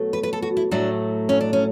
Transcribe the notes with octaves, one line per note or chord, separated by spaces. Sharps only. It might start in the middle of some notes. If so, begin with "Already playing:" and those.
Already playing: B2 F#3 A3
B4
B4
A4
F#4
E4
A2 F#3 A3 D4
C#4
D4
C#4